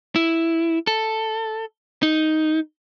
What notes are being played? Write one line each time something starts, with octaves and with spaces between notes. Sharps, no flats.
E4
A4
D#4